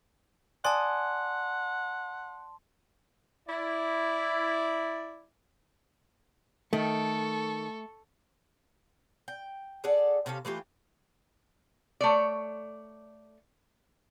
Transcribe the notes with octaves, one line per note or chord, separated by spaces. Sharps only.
D5 F#5 G#5 A5 C6 D#6
E4 D5
D#3 A3 A4 C#6
G5
G#4 A4 D5 F#5
C3 C#4 A4 F5
E3 A3 F4 G4
A3 C#5 D5